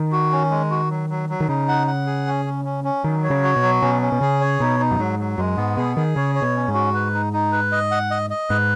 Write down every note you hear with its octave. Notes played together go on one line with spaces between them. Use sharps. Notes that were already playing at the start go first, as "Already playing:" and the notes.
Already playing: D#3
F#4
C#4
G#3
F#4
F#3
F#3
F#3
D#3
C#3 D#4
F#5
F#5
G#4
C#4
C#4
C#4
C#4
D#3 F#3
C#5
C#3
F#4
B2
F#3
B2 C#4
C#4
B2
C#3 G#4
C#5
B2 D#4
D#4
F#2
G#2 F#3
F#3
F#2 G#3
G#2 B3
B2 G#4
D#3 G#4
C#3 C#5
C#5
B2
C#4
G#2
F#4
B4
D#4
D#4
B4
D#5
F#5
D#5
D#5
G#2 B4